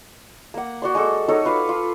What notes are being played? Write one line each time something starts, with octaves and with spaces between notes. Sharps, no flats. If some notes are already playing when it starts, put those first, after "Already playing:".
A#3 F#5
F#4 D5 C6
G#3 F#4 A4 D6
D#4 F#4 A4 C#5
F4 B4 F5 D6
F4